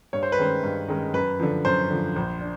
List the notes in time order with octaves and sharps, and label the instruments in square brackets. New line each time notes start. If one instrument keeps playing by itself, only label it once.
[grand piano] G2 C#5
C5
B4
D#3 G#3 C#4 C5
G2
D#3 G#3 C#4
F#2 B4
D3 F3
F#2 C5
D3 F3
A#1
D4